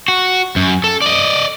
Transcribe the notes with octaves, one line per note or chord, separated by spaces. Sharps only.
F#4
F#2
A4
D5 D#5